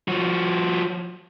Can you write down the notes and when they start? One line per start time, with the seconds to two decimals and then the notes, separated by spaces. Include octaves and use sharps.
0.08 F3 F#4